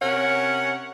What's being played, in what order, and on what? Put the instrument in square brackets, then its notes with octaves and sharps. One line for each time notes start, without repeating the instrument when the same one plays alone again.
[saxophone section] C3 C#4 A#4 C#5 F#5